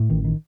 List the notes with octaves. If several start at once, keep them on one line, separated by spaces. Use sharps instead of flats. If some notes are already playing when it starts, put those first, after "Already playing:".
Already playing: A2
A1 D#3
D#3